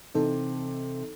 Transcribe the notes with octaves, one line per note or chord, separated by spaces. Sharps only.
C3 E3 D#4 A4